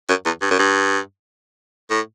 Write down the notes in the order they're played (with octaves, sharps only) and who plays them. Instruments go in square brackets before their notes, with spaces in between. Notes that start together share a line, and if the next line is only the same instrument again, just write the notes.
[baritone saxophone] F#2
E2
G2
F#2
G2
A2